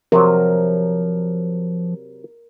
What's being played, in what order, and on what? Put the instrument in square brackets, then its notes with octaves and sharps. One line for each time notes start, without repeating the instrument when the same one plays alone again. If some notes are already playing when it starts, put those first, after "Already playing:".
[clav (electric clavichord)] C3 F#3 [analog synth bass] F3 [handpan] A#4